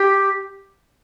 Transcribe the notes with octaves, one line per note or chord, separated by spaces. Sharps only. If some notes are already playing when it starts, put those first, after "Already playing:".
Already playing: G4